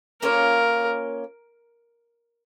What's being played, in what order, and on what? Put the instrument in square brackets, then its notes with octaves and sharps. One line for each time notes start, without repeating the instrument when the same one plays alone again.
[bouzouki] A#3 C#4 F4 C#5 [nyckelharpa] A#4